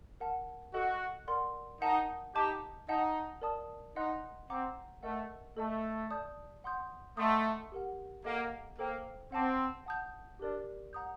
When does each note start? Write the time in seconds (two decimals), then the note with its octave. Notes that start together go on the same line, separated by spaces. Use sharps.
0.20 A#4 F#5 A5
0.74 F#4 A4 D#5 F#5
1.28 A#4 D5 F#5 C6
1.81 D#4 A#4 F#5 A5
2.35 D#4 G4 D#5 A5 D6 G6
2.88 D#4 D#5 F#5 A5
3.42 A#4 D5 A5 D#6
3.96 D#4 D#5 F#5 C6 F#6
4.50 C4 F#5 A#5 D6
5.03 A3 A#4 D#5 F#5
5.56 A3 A4 D#5 A5
6.11 D5 A5 D#6 G6
6.64 F#5 C6 D#6 G6
7.17 A3 D#5 F#5 C6 D#6
7.72 G4 A#4 F#5
8.25 A#3 A4 D#5 F#5 A#5
8.79 A#3 A4 C5 G5
9.32 C4 F#5 A5 D6
9.86 F#5 A5 D#6 G6
10.39 D4 G4 A#4 D5
10.93 F#5 A#5 D#6 G6